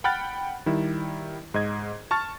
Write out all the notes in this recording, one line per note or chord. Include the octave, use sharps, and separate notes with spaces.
F#5 G5 B5 F6 F#6 A6
D#3 G3 E4
G#2 D#5 G#6
A5 C#6 F6 A6